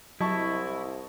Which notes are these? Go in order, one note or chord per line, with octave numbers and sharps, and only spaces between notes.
C2 F#3 E4 D#5 A5 C#6